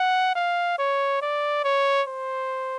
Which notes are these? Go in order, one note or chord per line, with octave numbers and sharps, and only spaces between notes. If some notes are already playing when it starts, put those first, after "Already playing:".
Already playing: F#5
F5
C#5
D5
C#5
C5